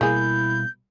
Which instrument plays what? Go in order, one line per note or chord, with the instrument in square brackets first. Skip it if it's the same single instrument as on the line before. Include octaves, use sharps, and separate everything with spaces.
[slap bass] B2 G3 [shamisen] A#3 G#4 [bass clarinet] E4 [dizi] G6